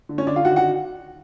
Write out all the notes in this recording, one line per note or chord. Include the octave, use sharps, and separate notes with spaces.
D3
C#4 C#5
D3 D4 D5
F4 F5
D#3 F#4 F#5
F#4 F#5